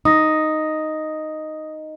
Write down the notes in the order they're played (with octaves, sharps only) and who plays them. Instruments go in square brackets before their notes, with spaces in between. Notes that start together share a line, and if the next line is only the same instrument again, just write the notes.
[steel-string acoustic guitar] D#4 [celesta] D#6 A#6